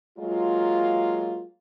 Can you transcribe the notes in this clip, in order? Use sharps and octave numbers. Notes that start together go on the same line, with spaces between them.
F#3 G#3 A#3 F4